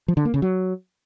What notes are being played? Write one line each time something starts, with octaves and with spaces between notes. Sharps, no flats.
F3
D3
A#3
C#3
F#3